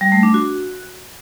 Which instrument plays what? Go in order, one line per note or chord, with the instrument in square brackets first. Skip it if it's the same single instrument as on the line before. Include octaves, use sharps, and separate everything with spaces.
[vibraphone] G3
A3
D4
F#4